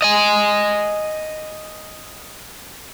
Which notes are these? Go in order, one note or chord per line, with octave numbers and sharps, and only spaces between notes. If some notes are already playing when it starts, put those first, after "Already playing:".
D#5 G#5